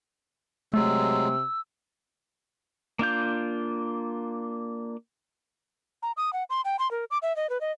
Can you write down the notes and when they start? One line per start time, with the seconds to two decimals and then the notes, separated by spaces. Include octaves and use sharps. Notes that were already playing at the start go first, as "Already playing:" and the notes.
0.74 C3 F#3 G#3 A3 E6
2.99 A#3 D4 F4 G6
6.03 A#5
6.17 D#6
6.33 F#5
6.50 C6
6.65 G5
6.79 C6
6.91 A#4
7.11 D6
7.22 E5
7.36 D#5
7.50 B4
7.61 D#5